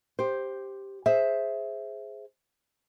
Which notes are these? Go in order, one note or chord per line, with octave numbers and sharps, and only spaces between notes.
G4 C5
G#4 C5 E5